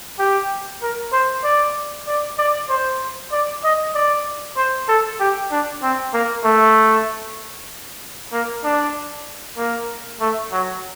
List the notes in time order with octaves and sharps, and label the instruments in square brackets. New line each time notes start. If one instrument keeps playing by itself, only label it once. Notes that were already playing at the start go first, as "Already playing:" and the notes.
[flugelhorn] G4
A#4
C5
D5
D5
D5
C5
D5
D#5
D5
C5
A4
G4
D4
C4
A#3
A3
A#3
D4
A#3
A3
F#3